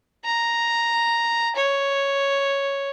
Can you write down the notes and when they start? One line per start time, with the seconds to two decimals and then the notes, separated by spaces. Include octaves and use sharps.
0.24 A#5
1.56 C#5